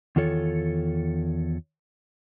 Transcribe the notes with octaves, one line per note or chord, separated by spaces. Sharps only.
E2 D#3 F4 A4 C#5